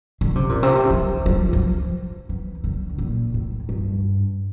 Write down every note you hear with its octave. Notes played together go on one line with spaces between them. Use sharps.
D3
C3
A#2
C3
E3
F3
F3
E3
D3
A#2
A2
G2